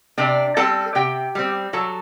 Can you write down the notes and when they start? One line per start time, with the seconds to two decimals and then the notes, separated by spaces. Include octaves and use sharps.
0.18 C3 D4 D5
0.57 G3 C4 A4 A5
0.95 C3 G4 G5
1.35 G3 C4
1.73 F#3 A4 A5